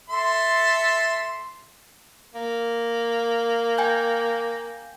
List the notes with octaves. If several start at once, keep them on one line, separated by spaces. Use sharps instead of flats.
A4 E5 C6
A#3
G5 G#5 G6